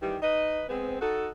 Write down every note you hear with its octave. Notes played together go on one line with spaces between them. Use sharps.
D#3 E3 G3
D#4 B4 D#5
G#3 B3 C4
D#4 F#4 A4